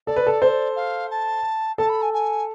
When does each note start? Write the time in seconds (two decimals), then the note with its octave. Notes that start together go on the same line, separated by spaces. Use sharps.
0.07 A4 D5
0.16 B4
0.27 A4
0.42 A4 C5
0.76 F5
1.10 A5
1.78 A4 A5
1.89 B5
2.02 G#5
2.13 G#5